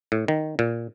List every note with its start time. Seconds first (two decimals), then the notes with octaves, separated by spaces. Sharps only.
0.12 A2
0.28 D#3
0.59 A#2